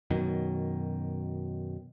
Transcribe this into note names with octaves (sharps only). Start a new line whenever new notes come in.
F#2 B2 D#3